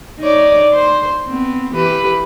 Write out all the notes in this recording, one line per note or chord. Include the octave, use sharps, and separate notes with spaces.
D#4 C#5 D5
C5
B3 C4
E3 G4 B4